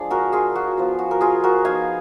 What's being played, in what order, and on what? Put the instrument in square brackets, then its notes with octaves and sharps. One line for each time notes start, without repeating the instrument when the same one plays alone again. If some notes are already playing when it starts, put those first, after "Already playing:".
Already playing: [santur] F3 G#3 D4 G#4 D5
F#4 A#4
F4 G#4
F#4
F3 B3 F4
F#4
A#4
F4 G#4
F#4 A#4
F3 B3 D#4 F5 G#5